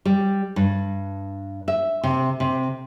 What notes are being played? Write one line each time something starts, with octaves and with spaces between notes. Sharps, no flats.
G3
G2
E5
C3
C3